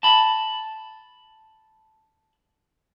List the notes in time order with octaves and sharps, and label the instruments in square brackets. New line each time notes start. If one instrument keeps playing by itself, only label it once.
[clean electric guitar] A5 B5